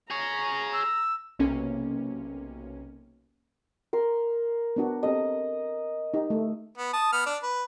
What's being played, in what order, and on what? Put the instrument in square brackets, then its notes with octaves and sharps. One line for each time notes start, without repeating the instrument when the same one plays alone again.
[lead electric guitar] G#4 C#5 [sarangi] A#5
[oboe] E6
[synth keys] B1 C3 A#3 C#4
[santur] A#4 C6
[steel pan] B3 D4 F#4
[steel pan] C4 G4 A4 [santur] D#5
[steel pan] D#4 G4
A3
[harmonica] B3
A5 D#6
B3 F6
D4 D5
B4